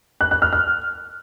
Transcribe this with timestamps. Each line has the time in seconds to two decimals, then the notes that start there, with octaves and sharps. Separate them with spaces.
0.21 F#6
0.31 F#6
0.42 F6
0.53 F6